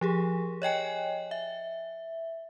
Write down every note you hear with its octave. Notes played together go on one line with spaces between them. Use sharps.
F3 G4 G#4
C#5 D#5 G5 G#5
E5